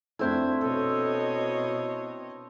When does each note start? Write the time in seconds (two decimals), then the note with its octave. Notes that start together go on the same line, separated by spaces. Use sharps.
0.19 F2 A3 C4 D4 E4 C5 G#6
0.61 B2 A4 C#5 D#5